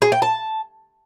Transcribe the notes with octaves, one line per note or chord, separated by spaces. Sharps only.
G#4
G5
A5